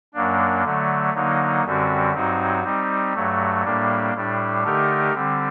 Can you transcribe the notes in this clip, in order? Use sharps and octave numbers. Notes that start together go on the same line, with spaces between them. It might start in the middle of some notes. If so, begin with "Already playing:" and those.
F#2 F#3 A#3 D4
D3 F#3 A3
D3 F#3 A#3 D#4
F#2 D3 G3 C4 F#4
G2 F#3 C4 D#4 F#4
G3 C4 D#4
G2 F#3 A3
A2 G3 A#3 D4
A2 G3 D4
D3 A3 D#4 G4 A#4
D3 G3 C4